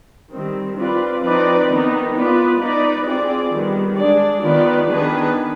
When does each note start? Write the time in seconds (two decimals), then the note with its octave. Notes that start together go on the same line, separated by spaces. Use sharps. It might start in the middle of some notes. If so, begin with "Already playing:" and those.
0.32 D#3 G3 C4
0.77 C4 F4 B4 D5
1.22 F3 C4 D#4 B4 D5
1.68 D#3 B3 D#4
2.14 B3 F4 B4 D5
2.60 B3 D#4 B4 D5
3.05 C4 F4 G#4 D5
3.52 D#3 G3 B3
3.97 G#3 D4 G#4 D5
4.43 D#3 B3 F4 B4 D5
4.88 D#3 B3 D4 G#4 B4